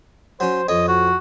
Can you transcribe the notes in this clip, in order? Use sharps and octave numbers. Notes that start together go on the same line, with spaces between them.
F#3 C#4 C5
F2 C#5 D#5
F#4